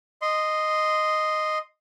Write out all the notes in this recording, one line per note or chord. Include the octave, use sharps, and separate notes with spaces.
D#5 C6